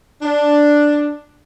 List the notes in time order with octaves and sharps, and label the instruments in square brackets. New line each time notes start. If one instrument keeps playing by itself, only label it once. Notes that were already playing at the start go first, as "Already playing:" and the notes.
[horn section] D4